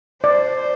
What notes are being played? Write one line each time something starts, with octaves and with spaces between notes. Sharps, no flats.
C5 D5